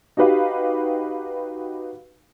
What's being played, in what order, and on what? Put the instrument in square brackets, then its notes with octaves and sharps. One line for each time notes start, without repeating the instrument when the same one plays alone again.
[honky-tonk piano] D#4 F#4 G4 B4 F5